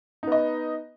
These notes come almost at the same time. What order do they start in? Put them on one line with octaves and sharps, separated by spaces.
D#4 B3 D#5